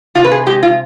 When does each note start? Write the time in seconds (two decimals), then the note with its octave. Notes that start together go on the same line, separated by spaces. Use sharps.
0.15 C3 F4
0.24 B4
0.32 G#4
0.46 G#3 G4
0.63 F4